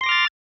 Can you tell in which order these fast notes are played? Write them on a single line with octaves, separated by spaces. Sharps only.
C6 A#6 D6 F6 A6